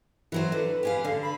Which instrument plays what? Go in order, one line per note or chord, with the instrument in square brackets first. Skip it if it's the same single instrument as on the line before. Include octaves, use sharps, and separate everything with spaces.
[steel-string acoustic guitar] E3 F#3 C5
[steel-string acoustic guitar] D3 [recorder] B4
[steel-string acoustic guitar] G4 G#4 F5
[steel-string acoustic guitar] D3 [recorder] F5
[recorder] B5